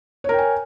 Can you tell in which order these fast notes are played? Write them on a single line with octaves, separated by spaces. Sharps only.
C#5 A#4 G5 G#5